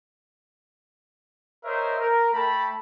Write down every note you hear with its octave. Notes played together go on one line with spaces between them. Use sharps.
A#4 C5 C#5 D#5 E5
A#4
A3 G5 A5 B5